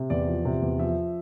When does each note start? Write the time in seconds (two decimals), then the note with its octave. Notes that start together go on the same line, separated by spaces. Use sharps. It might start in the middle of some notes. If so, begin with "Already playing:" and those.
Already playing: C3
0.10 E2 D5
0.27 F3
0.45 C3
0.62 E2
0.79 F3 E5